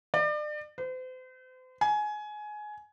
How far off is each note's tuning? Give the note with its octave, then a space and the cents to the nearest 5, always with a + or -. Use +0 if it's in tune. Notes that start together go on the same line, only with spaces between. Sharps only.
D5 +35
C5 -40
G#5 +20